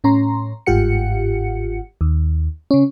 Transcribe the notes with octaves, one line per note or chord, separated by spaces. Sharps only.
A2 C#4 A#5 C6
G1 G#2 F4 G4 F#5 C#7
D#2
C#3 C#4